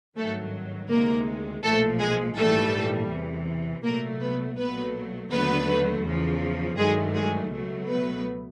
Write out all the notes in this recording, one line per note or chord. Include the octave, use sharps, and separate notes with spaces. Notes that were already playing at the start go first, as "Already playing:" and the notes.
G#1 G2 D#3 F#3 A3 A4
D2 C3 D#3 G#3 A#3 A#4
B1 A#2 F3 A3 A4
G#3 G#4
A#1 G#2 E3 G3 A3 A4
E2 C3 E3
C2 A#2 F#3 A3 A#3 A#4
B3 B4
B1 A#2 F#3 A3 B3 B4
D#2 D3 F#3 A3 B3 B4
E2 C#3 F3
G2 D#3 F#3 G#3 A3 G#4
G#3 G#4
C#2 B2 F#3 A3
B3 B4